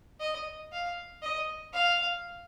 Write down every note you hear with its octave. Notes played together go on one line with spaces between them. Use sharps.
D#5
F5
D#5
F5